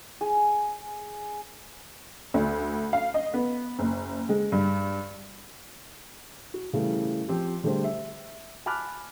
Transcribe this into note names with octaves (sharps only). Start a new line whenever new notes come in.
G#4
D2
F5
D#5
B3
F#1
G#3
G2
F#4
C#3 E3 G3 A3
F3 C4 G4
D3 G3 A3 G4 G#4 C5
E5
G#5 A5 B5 D6 F6 F#6